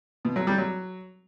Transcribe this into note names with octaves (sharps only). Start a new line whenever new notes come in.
B2
F#3
G3
F#3